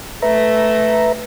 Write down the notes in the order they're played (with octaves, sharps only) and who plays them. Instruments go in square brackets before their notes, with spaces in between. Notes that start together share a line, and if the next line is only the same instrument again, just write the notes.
[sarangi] A3 [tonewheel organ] B4 E5 A#5